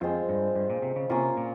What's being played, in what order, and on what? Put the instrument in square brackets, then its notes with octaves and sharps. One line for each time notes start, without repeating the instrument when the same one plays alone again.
[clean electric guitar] F2 [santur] G#3 C4 F4
[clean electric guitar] G2
G2
A#2
C3
C#3
[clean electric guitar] C3 [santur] A#3 C#4 F4
[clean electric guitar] A#2